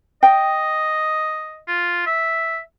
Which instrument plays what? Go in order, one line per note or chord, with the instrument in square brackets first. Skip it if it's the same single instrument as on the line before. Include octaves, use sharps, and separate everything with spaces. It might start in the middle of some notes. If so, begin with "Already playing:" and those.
[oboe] D#5 [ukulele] G5
[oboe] F4
E5